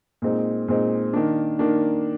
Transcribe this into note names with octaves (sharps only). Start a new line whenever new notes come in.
A#2 G#3 C4 D#4
A#2 G#3 C4 D#4
D#3 A#3 D4
D#3 A#3 D4